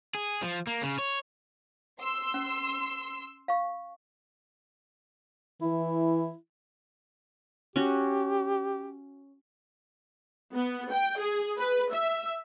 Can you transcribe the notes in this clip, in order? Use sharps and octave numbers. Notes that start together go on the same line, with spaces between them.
G#4
F3
A#3
C#3
C#5
C6 E6
C#4
F5 C#6
E3 E4
C#4 F#4 G4
B3
G5
G#4
B4
E5